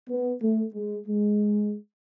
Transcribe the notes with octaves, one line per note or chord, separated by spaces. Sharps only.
B3
A3
G#3
G#3